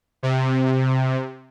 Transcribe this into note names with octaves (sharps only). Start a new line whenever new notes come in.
C3